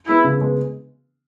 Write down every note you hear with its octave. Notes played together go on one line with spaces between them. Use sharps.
G#3 B3 E4
C#3
G#3 B3